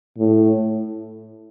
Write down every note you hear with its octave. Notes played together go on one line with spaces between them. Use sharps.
A2